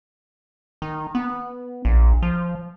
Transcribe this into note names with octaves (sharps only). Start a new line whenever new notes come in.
D#3
B3
A#1
F3